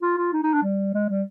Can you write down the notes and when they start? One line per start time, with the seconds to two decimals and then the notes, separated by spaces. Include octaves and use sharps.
0.02 F4
0.17 F4
0.33 D#4
0.43 D#4
0.53 D4
0.63 G3
0.94 G#3
1.09 G3